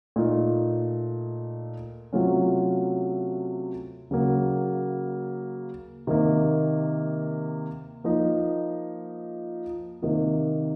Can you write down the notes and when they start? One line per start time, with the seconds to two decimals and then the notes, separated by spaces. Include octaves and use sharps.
0.16 A#2 A3 D#4
2.13 C3 F#3 A3 C#4 F4
4.11 C#3 F#3 A#3
6.07 C3 D#3 A#3
8.04 F3 A#3 D#4
10.02 C3 D#3 A#3 D#4